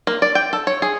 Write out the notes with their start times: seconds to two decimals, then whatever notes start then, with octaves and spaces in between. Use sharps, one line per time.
0.07 A#3
0.22 D5
0.35 G5
0.53 A4
0.67 C#5
0.82 G#4